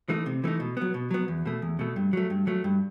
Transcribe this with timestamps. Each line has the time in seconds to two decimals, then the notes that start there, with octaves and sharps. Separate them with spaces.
0.09 E3 A3 D#4
0.26 C3
0.44 E3 A3 D#4
0.60 B2
0.77 F#3 B3
0.94 B2
1.11 F#3 B3
1.28 E2
1.46 B2 A3
1.62 E2
1.79 B2 A3
1.96 G2
2.13 F#3 A3
2.30 G2
2.47 F#3 A3
2.64 G2